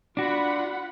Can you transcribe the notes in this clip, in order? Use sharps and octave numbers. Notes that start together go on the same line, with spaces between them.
D4 F4 F#4 F#5 B5